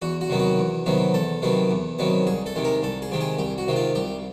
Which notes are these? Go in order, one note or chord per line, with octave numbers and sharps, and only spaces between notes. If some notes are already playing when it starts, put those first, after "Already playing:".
E2 F#4
F#4
C3 D#3 F#3 B3
F#4
E2
C3 D#3 F#3 B3
E2 A4
C3 D#3 F#3 B3
E2
C3 D#3 F#3 B3
C2 G#4
A4
C3 D#3 G#3
A#4
C2 A4
G#4
C3 D#3 G#3
G#4
C2 G4
F#4
C3 D#3 G#3
F4
C2 G4